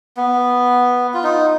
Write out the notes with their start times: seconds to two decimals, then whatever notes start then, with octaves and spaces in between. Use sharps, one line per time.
0.17 B3
1.14 F4
1.24 D#4